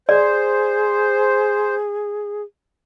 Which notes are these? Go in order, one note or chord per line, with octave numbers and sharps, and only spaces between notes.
G#4 C5 D5